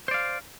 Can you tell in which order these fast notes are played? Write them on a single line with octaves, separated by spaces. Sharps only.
C5 D5 F5